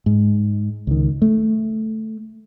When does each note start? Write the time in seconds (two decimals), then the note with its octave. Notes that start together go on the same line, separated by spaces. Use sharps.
0.06 G#2
0.87 C#2 D#3
1.22 A3